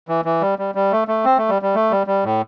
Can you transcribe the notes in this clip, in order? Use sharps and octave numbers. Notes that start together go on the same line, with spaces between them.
E3
E3
G3
G3
G3
A3
A3
C4
A3
G3
G3
A3
G3
G3
A2